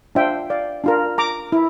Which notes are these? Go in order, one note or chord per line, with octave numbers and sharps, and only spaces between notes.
D4 F4 C5 E5 G5
D5 F5
D4 F4 A#4
A#5 D6
E4